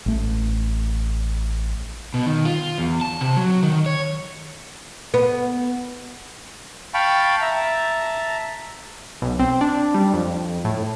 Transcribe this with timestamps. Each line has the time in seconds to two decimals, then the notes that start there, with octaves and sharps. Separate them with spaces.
0.06 A1 A3
2.14 B2
2.26 D#3
2.45 F4
2.78 E2
3.01 A5
3.21 C3
3.36 F#3
3.63 D#3
3.86 C#5
5.14 B3
6.94 F5 G5 A5 B5 C#6
7.42 E5 A5 A#5
9.22 B1
9.39 C4
9.61 D4
9.94 G3
10.13 F2
10.65 A2